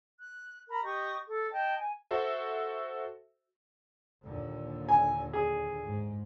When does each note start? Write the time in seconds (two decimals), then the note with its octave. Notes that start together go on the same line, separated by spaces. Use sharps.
0.20 F#6
0.69 A#4 A#5 B5
0.84 G4 D#5 C#6 D#6
1.28 A4
1.51 D#5 G5 A5
1.79 G#5
2.11 F#4 A4 C5 E5
4.24 D#2 A#2 D3
4.89 G#5
5.33 G#4
5.84 G#2